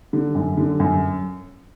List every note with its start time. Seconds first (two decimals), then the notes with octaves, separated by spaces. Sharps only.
0.13 D3
0.35 F#2
0.57 D3
0.80 F#2